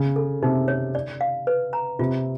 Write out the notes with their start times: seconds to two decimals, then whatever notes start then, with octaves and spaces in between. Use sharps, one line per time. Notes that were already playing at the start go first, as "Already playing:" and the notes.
Already playing: C#3
0.16 A4
0.42 C3 D#4
0.68 C#5
0.95 D5
1.21 F5
1.47 B4
1.73 A#5
1.99 C3 F4